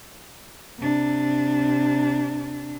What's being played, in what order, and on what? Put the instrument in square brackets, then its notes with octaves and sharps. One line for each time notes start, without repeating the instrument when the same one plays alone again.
[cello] C3 D4